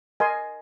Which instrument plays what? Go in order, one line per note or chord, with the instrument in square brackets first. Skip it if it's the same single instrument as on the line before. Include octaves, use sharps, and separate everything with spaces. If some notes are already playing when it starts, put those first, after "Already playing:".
[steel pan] A#4 D#5 G#5 C6